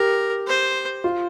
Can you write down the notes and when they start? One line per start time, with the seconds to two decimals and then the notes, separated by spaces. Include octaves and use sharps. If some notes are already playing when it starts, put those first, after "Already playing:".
Already playing: G4 A#4
0.47 C5
1.04 F4